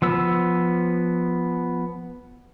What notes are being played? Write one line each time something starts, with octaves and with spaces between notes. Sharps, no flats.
F3 B3 E6